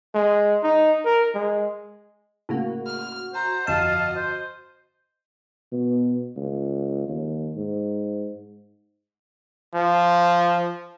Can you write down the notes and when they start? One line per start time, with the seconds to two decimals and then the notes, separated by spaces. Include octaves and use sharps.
0.15 G#3
0.63 D#4
1.05 A#4
1.35 G#3
2.49 A2 C#3 A#3 F#4
2.87 F6
3.34 C5 A#5
3.67 G1 F2 D#5 F5 A5
4.16 C5
5.72 B2
6.36 C#2
7.08 D#2
7.56 G#2
9.75 F3